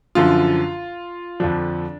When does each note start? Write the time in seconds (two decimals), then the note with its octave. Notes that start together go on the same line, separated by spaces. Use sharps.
0.15 F#2 D3 F3 F4
1.40 F2 D3 F3 D4